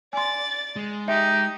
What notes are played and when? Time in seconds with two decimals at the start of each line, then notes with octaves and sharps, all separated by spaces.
0.13 D5 G#5 C6 A6
0.76 G#3
1.08 D#4 G4 E5